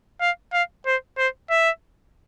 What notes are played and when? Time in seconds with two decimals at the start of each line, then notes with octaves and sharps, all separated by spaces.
0.21 F5
0.53 F5
0.86 C5
1.18 C5
1.50 E5